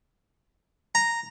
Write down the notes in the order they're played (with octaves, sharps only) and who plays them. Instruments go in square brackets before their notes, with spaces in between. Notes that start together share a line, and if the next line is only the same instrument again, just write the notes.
[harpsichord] A#5